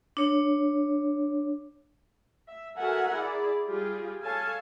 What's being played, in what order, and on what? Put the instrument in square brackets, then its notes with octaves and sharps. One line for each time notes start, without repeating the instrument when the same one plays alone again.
[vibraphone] D4 C#5
[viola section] E5
F#4 A4 A#4 E5 F#5 G#5
E4 G#4 D5
G3 F4 G4 G#4
A4 C#5 F5 G#5 A5